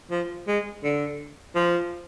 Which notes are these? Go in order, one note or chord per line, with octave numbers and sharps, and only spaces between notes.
F3
G#3
D3
F3